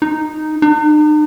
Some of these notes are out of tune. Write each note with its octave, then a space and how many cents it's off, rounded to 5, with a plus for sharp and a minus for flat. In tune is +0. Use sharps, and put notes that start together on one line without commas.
D#4 -5
D#4 -45